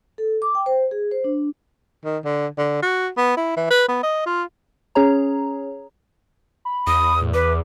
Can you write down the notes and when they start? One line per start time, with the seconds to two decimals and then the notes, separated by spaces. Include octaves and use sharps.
0.18 A4
0.42 D6
0.55 G5
0.66 C5
0.91 G#4
1.12 C5
1.24 D4
2.04 D#3
2.25 D3
2.58 D3
2.82 F#4
3.17 B3
3.37 E4
3.57 E3
3.70 B4
3.88 B3
4.03 D#5
4.26 F4
4.95 C#4 G#4 C#5 A#5
6.65 B5
6.87 E2 D#6
7.21 A2
7.34 B4 D6